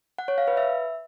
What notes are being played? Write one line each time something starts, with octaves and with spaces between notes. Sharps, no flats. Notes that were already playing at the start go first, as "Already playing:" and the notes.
F#5
C#5
F5
B4
E5